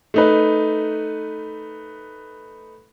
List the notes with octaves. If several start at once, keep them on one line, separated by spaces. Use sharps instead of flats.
A3 D#4 B4